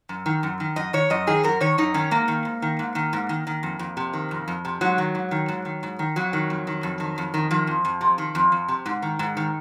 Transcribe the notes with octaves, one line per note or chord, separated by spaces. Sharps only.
F#2
D#3
F#2
D#3
F#2 D#5
D#3 C#5
F#2 D#5
D#3 G#4
F#2 A#4
D#3 C#5
F#2 D#4
D#3 C#4
G#2 A#3
D#3
G#2
D#3
G#2
D#3
G#2
D#3
D#3
F2
F2
C3
D#3
F2
F2
C3
G#2 F#3
D#3
G#2
D#3
G#2
D#3
G#2
D#3
F2 F#3
D#3
F2
D#3
F2
D#3
F2
D#3
D#3 F3
F2
F2
C3
D#3
F2
F2
C3
G#2
D#3
G#2
D#3